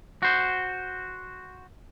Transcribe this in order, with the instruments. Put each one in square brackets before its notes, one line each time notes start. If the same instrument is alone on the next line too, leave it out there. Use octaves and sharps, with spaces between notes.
[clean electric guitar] F#4 C5